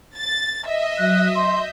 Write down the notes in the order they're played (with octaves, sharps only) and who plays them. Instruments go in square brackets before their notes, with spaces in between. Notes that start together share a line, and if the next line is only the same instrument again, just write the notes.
[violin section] A6
D#5 E5
[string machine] F#3 D#6 [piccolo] F#6
[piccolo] C6 [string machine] G6